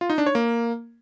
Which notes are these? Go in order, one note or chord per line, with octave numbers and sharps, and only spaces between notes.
F4
D#4
D4
C#5
A#3